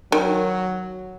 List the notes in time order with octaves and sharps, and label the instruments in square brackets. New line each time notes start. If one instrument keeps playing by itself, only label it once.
[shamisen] D#3 [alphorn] F#3